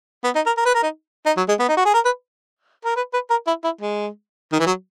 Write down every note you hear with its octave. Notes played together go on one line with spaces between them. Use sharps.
B3
D#4
A#4
A#4
B4
A#4
D#4
D#4
F#3
G#3
B3
D#4
F#4
G#4
A#4
B4
A#4
B4
B4
A#4
E4
E4
G#3
D#3
E3
F#3